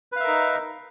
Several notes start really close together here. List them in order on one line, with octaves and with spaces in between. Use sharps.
B4 F5 E5 A#4 D#4